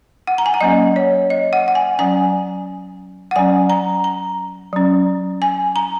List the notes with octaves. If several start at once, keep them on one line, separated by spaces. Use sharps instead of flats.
F#5
A#5
G#5
F#5
F#3 A#3 C#4 D#5
C#5
D#5
F#5
F#5
G#5
F#3 C#4 G#5
F#5
F#3 C#4 G#5
A#5
A#5
F#3 C#4
G#5
A#5